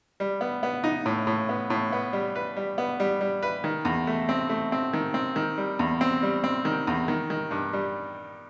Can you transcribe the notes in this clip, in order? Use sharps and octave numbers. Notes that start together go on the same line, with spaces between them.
G3
B3
B3
D#4
A2
A2
B3
A2
B3
G3
B4
G3
B3
G3
G3
B4
D#3
E2
A3
C4
A3
C4
D#3
C4
D#3
G3
E2
C4
G3
C4
D#3
E2
D#3
D#3
G2
G3